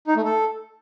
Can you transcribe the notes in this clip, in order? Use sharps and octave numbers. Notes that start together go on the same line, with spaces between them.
D#4
A3
A4